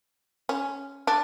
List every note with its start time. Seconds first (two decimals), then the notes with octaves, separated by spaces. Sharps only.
0.49 C#4
1.07 D4